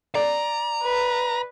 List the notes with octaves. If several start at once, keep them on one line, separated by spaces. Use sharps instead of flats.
D5 A#5
B4